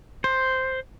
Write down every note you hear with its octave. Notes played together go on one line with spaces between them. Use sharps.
C5